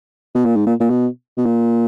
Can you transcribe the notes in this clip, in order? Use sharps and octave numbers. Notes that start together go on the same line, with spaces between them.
B2
A#2
G#2
A#2
A#2
B2
B2
A#2